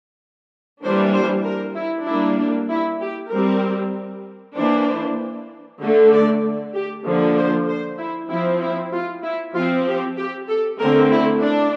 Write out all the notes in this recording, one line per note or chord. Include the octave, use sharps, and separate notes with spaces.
E3 G3 A#3 D4 C5
C5
A#4
E4
G3 A#3 D4 E4
D4
E4
G4
G3 C4 A#4
E3 A#3 D4 C5
D3 A3 D4
D5
G4
D3 F3 A#3 D4
C5
C5
E4
F3 C4 E4
E4
F4
E4
F3 C4 F4
G4
G4
A4
D3 A3 C4 A#4
E4
D4